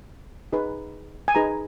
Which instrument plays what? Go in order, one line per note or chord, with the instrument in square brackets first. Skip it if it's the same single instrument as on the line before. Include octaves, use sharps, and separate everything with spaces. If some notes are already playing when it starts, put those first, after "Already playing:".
[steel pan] D#4 G#4 B4
G#5
D#4 G#4 B4 A#5